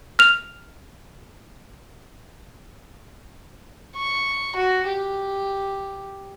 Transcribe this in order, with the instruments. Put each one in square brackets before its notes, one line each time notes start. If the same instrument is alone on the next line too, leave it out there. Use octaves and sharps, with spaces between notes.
[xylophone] F6 F7
[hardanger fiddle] C#6
F#4
G4